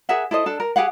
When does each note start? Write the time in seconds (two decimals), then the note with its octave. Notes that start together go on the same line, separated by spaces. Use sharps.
0.09 G#4 A#4 E5 F#5
0.31 E4 A4 C5 D#5
0.46 D4 A4
0.60 A#4
0.76 G4 G#4 F5 F#5